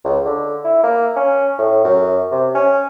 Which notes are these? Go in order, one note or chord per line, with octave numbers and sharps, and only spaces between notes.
C#2
D3
E4
A#3
C#4
A2
F#2
C3
C#4